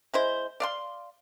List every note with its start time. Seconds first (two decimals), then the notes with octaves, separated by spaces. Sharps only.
0.14 G#3 E4 C5
0.60 D5 F5 C6